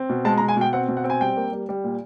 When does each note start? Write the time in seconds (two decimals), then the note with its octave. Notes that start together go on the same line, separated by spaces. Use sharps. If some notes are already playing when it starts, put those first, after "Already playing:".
Already playing: C4
0.10 B2
0.25 G#3 A5
0.38 A#5
0.40 B2
0.48 G#5
0.57 B2 G5
0.73 C4 F#5
0.88 B2
0.97 F#5
1.04 C4
1.10 G#5
1.20 G3 G5
1.37 A#3
1.52 G3
1.69 G3
1.84 A#2